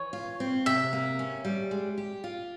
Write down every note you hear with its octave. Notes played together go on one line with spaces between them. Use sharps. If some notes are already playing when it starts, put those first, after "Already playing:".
Already playing: E3 C#5
F4
C4
C3 E5
A#3
C#4
G3
G#3
G4
F4